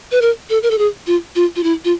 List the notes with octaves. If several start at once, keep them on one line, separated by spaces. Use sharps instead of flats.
B4
A#4
A4
A#4
A4
G#4
F4
F4
F4
E4
F4